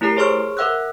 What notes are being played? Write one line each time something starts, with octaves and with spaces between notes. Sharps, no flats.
A3 E4 G4 A#4 A#5 C7
G#4 C5 C#5 C6 C#6 F6
A#4 E5 F#5 E6 F#6